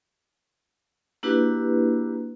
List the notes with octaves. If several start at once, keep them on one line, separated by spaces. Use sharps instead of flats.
A#3 D4 E4 F#4 G4 B4